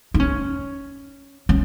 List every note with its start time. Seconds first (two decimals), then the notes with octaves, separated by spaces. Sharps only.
0.14 D#4
0.20 C#4
1.49 C#4